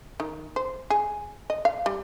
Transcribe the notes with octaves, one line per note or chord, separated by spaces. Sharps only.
D#3
C5
G#4
D#5
F5
G3